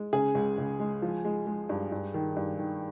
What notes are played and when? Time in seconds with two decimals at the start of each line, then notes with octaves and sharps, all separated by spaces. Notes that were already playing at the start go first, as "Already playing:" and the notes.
Already playing: G#3
0.13 C#3 G#4
0.35 C#2
0.58 C#2
0.80 G#3
1.02 F3
1.25 G#3
1.47 G#3
1.69 G2
1.92 G2
2.14 D#3
2.36 G2
2.59 D#3